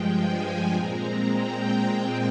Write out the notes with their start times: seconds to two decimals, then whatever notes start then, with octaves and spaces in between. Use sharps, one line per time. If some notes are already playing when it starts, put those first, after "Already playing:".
Already playing: G2 F3 G#3 G5
0.13 G#5
0.72 A#2 G#3 C4 A#5
1.31 G5
1.90 A#2 G#3 C4